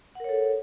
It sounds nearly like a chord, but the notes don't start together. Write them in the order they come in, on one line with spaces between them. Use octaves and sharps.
F#5 A#4 C#5 A4